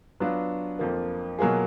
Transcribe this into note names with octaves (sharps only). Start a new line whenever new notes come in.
F#3 B3 D4 F4
F2 F3 A#3
B2 F#3 A#3 F4 G#4